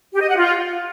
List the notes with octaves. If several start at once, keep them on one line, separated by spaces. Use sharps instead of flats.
G4
D#5
F#5
F4